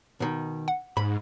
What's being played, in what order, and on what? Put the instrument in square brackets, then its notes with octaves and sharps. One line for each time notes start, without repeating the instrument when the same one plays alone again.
[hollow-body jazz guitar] B2 D#3
[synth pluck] F#5
[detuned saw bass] G#2 [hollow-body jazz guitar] B5